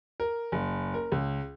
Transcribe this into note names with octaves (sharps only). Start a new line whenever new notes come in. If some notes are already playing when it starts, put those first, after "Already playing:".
A#4
F#1
A#4
C#2